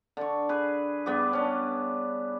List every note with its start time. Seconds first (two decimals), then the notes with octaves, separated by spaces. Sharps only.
0.17 D3 C#6
0.49 G#4 B4
1.06 G2 B3 G#4 D6
1.33 C#4 D4